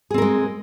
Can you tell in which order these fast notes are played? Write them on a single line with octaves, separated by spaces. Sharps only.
G#4 C4 A#4 G#3